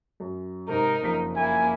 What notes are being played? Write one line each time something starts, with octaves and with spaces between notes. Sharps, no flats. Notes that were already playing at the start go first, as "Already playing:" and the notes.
F#2
G#2 C3 D#4 A#4
F#1 F2 B6
A#3 E4 G#5